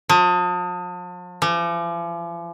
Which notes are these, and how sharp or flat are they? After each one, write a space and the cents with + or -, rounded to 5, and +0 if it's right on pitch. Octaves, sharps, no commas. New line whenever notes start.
F3 +40
F3 -45